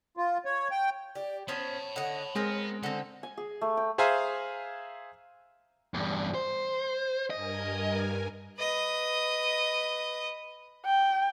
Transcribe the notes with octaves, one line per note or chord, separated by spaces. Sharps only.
F4
C#5
G5
G4 D5
B3 C#4 C5 C#5 A5 B5
D3 D#5 F#5
G#3 B3 C4 A#4
D3 C4 A4
G#5
G#4
A3
G5
G#4 C5 E5 F5 G#5 A#5
E2 G2
C5
G2 A#4 D#5 G#5
B4 D#5
G5